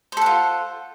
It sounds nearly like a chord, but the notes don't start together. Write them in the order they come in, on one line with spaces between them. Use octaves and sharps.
C5 A4 F#5 F4